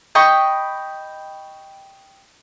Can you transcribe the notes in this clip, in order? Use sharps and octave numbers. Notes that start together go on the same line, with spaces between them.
D#5 G5 B5 C#6